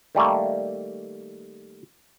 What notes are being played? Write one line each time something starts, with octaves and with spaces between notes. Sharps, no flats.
D#3 G3 A3 A#3